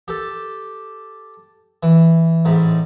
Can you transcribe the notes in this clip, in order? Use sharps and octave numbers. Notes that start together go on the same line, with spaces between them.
G4 A4
E3
A1 G#2